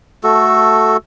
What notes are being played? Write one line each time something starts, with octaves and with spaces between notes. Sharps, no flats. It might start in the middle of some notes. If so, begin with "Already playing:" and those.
A3 F#4 A4